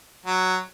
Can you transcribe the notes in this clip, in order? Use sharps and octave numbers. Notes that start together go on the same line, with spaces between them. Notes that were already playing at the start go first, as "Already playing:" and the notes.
F#3